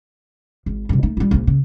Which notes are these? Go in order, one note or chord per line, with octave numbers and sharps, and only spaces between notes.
G#1
G2 C3
A3 D#4
G3 F4
A#1 A#2
C#3